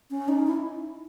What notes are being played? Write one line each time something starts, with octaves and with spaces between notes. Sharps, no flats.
C#4
D#4
E4